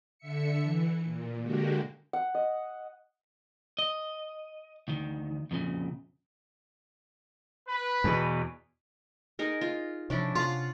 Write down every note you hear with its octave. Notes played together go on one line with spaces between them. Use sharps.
D3 E5 C#7
E3
A#2
D3 G#3 A#3 F#4 G4
F#5
D#5
D#5
D2 D#3
F2 A#2 C#3
B4
E2 B2
D#4 G#4 A#4
F4
C3 F3 C#4 D4 E4
C3 F4 F5 F#5